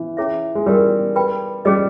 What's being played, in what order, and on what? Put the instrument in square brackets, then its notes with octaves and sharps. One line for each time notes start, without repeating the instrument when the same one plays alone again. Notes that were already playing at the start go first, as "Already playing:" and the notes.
Already playing: [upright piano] E3
[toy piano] C#4 E4 G#4 C#5 E5
[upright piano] G#3
[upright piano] G3 [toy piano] C#4 E4 G4 A#4
[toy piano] B4 G5 B5
[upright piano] G3 [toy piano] C#4 G#4 D#5